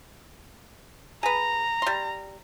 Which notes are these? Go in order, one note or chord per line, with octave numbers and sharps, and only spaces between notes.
G#4 B4 A#5
G3 C6